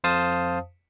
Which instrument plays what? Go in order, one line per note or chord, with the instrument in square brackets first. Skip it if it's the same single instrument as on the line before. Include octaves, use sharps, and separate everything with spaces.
[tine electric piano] F2 C5 F5 A5 D#6